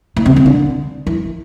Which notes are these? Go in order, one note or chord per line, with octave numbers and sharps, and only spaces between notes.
A2
C3
C3
D3
E3